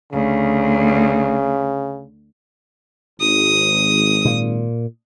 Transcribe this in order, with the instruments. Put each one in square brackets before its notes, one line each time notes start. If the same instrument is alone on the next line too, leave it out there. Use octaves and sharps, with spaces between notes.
[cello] D2 [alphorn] C#3
[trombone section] G#1 [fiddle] D#6
[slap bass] A#2